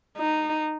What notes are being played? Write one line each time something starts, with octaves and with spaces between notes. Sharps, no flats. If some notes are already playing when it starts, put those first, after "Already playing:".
D#4